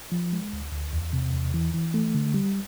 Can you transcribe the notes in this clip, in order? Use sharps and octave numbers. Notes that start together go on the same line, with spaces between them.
F3
G#3
D2
D2
E2
C3
E2
E3
E3
A3
D3
G3